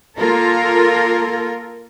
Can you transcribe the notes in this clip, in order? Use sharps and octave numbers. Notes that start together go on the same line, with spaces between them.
A#3 F4 A4 A#4